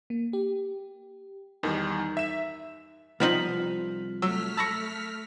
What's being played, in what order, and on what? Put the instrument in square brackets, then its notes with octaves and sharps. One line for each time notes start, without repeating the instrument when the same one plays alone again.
[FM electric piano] A#3
G4
[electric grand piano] E2 D#3 G3 [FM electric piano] D#4 A#4
[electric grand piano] E5 E7
[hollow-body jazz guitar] C2 F3 [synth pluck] B3 C4 D#4 [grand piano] F6 B6 F#7
[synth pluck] F#3 [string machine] A3 F6 B6 [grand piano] E6
[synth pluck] A5 B5 C#6 [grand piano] E6 A#6 C#7